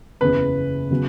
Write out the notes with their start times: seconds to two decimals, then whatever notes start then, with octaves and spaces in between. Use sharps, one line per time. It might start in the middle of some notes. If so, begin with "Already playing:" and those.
0.21 F#1 E2 C#3 B4
0.91 C#3 F#3 B3